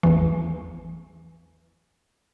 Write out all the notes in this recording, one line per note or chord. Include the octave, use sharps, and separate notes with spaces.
A1 E2 E3